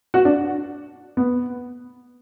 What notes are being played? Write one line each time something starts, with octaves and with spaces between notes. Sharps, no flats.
F#4
D4
B3